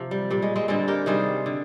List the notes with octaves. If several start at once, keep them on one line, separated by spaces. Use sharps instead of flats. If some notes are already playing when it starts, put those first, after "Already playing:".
Already playing: C3 F3
G3
A#2 G3
G#3
G#3 C4
D3 G3 G#3 C4
G4 A#4
C3 D#3 G3 G#4 C5
D3